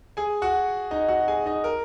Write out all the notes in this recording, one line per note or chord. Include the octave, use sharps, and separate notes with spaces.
G#4 G#5
F#4 F#5
D#4 D#5
F#4 F#5
G#4 G#5
D#4 D#5
A#4